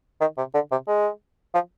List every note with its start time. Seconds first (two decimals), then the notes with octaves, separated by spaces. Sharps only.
0.21 D#3
0.38 C3
0.54 D3
0.71 C3
0.88 G#3
1.54 F3